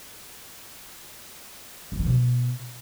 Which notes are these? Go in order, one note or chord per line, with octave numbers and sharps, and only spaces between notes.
F2
D#3
B2